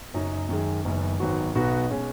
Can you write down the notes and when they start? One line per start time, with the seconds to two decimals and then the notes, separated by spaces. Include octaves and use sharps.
0.14 F#1 F#2 F#3 D#4
0.49 F#2 D#3 G#3
0.85 F#1 F#2 D#3 B3
1.20 G#1 G#2 F#3 B3 F#4
1.55 B1 B2 B3 D#4 F#4
1.91 B2 G#3 C#4